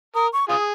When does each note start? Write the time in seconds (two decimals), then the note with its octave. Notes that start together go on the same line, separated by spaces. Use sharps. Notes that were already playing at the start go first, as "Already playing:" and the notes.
0.15 A#4 D#6
0.33 C#6
0.49 F4 G#4 D#6